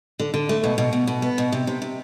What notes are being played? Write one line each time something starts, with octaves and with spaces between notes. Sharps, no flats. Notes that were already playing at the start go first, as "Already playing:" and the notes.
D3
D3
A3
B2
B2
B2
B2
B3
B2
C3
C3
C3